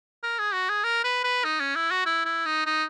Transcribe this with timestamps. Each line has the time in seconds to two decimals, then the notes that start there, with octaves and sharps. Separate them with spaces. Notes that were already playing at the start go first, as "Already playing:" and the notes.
0.23 A#4
0.39 G#4
0.53 F#4
0.69 G#4
0.84 A#4
1.04 B4
1.24 B4
1.44 D#4
1.60 C#4
1.75 E4
1.91 F#4
2.06 E4
2.25 E4
2.46 D#4
2.66 D#4